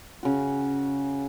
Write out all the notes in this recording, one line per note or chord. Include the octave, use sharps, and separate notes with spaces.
C#3 F#4